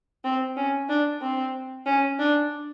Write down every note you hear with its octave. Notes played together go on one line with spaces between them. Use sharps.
C4
C#4
D4
C4
C#4
D4